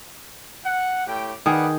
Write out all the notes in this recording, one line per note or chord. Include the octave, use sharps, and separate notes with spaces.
F#5
A2 G4 G5
D#3 G#4 B4 D5 F#5